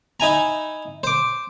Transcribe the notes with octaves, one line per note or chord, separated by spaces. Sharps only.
D#4 E4 G#5 A#5
C5 D6